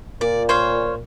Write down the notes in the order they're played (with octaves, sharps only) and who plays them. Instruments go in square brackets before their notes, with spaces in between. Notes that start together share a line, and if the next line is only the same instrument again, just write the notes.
[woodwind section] A#2 [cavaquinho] D5
[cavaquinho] C5 C#5 F5